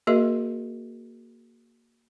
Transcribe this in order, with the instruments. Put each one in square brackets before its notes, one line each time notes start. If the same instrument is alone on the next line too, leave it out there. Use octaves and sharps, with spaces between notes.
[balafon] A#3 F#4 G#4 A#4 D#5 E5